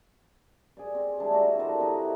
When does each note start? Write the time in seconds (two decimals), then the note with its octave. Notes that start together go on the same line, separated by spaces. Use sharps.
0.77 G#4 C5 D5
0.95 C4
1.17 G3 G#3 D4 E4
1.31 C3 F#4 G4 A#5
1.59 A4 A#4 C5 D5
1.79 C4 D#4 E4 B4